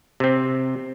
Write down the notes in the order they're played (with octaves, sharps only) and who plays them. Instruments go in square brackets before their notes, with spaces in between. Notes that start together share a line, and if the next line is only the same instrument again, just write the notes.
[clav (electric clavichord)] C3 C4